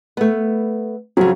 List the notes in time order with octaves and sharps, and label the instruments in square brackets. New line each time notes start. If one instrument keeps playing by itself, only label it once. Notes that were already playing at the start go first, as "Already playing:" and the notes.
[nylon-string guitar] A3 B3
[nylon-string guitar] F2 C#3 [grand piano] F#3